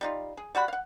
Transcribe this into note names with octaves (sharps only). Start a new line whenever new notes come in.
G3 D#4 F4
G#4
G3 F#4 F#5 B5
F5 F#5